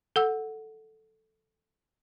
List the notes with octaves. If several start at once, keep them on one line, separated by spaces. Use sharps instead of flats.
A4 F#5 E6